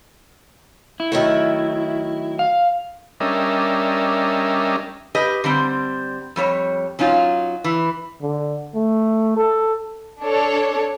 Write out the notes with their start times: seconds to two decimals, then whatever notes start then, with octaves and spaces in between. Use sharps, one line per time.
1.00 E4
1.12 D#3 F#3 A3
2.39 F5
3.20 G3 C#4 D4 A#4 D#5 E5
5.15 G4 B4 D#5
5.44 D3 G3 C4
6.36 F2 G3 C#5
6.99 F#3 C#4 D#4 F4
7.64 E3
8.22 D3
8.75 A3
9.37 A4
10.22 D4 A4 C#5